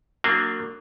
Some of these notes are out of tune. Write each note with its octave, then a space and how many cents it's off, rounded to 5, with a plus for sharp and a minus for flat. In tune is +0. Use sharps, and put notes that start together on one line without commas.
F#3 +0 A#3 -25 D4 +15